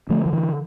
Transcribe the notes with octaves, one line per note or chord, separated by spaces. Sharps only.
D3 F3 A3
F3
E3